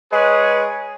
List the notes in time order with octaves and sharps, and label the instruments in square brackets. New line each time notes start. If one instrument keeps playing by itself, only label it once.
[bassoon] G#3 [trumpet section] G#4 B4 C#5